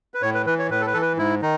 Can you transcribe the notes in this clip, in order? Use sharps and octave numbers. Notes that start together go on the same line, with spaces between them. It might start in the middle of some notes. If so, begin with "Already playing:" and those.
B4
A2 C#5
B4
E3 B4
C#5
A2 B4
A4
B4
E3 A4
B4
G#2 E4
D#3 D#4